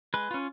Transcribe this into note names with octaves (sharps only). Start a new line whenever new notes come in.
G#3 B4
C#4 F4